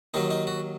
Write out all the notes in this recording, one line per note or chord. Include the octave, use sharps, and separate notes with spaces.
D#2 D#3 F#3 D#4
D#4
F#4